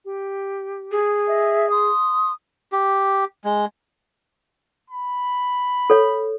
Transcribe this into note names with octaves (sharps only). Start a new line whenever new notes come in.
G4
G#4
D#5 E5
C6 D#6
G4
G#3
B5
A4 C#5